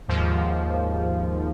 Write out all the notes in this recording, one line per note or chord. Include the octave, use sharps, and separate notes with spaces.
D#2 G#2 F3